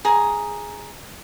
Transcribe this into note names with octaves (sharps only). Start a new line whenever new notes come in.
G#4 A#5